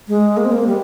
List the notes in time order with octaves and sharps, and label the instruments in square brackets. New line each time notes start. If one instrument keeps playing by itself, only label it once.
[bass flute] G#3
A#3
C4
A#3
G3